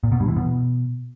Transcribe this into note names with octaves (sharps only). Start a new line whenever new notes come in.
A#2
B2
G2
E3
B2